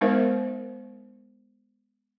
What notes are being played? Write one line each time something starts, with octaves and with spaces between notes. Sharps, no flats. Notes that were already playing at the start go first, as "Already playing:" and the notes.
G#3 B3 D#4 A#4 C5 E5